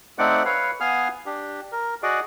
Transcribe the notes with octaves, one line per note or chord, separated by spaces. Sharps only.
A3 C4 D#4 D5 F#5
B4 C#5 F5
B3 F5 G#5 D#6 F6
D4 G4
A#4
F#4 G#4 D5 D#5